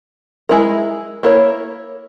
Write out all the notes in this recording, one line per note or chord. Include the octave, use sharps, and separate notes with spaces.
G#3 E4 A#4
A#3 E4 A#4 C#5